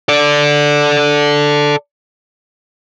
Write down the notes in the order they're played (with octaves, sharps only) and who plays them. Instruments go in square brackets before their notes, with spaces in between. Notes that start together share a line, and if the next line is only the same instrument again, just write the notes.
[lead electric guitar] A4 D5